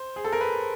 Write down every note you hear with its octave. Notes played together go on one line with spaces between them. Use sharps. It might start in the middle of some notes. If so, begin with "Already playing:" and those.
Already playing: C5
G#4
A4
A#4
B4